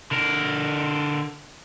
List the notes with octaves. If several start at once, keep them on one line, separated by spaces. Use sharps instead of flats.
D3 A#4